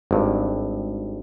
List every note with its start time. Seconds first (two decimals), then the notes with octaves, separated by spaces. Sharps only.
0.11 G#1 G2